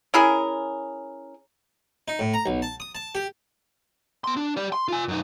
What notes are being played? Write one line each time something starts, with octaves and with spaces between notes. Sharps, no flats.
C#4 E4 G#4 A#4
D#4
A2
A#5
B1
A5
D#6
A5
G4
B3 C6
D4
G4 D5
C6
F4 G#5
F#2 D#4